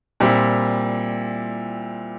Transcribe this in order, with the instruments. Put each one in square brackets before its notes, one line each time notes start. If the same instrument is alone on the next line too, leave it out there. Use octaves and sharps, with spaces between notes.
[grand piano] A#2 G3 C4 E4